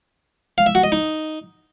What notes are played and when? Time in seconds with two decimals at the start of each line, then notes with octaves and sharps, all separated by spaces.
0.58 F5
0.66 E5
0.75 F#4
0.84 D#5
0.92 D#4